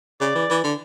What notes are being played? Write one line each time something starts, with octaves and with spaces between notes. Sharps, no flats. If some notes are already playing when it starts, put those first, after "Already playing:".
C#3 D5
E3
E3
D3